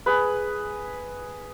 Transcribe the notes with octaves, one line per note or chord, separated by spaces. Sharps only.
G#4 B4